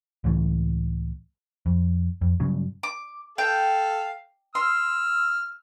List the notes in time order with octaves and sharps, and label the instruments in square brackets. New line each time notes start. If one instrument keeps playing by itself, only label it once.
[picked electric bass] C#2 A2 E3 A3
F2
F2
G2 C#3 F#3
[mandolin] D6
[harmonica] A4 F5 [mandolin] G5
[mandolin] C6 [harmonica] E6 F6